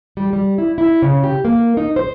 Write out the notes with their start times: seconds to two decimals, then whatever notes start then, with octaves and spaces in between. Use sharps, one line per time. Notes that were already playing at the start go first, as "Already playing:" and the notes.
0.17 G3
0.33 G3
0.58 E4
0.78 E4
1.02 C#3
1.24 G4
1.45 A#3
1.77 D#4
1.96 C5